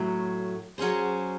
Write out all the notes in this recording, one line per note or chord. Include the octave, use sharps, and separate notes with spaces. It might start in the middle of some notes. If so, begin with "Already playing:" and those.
Already playing: A2 F#3 A3
F#3 C#4 G#4 C5